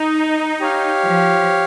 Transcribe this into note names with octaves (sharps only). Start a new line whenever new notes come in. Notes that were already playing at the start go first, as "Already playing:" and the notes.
Already playing: D#4
G4 C#5 F5
F3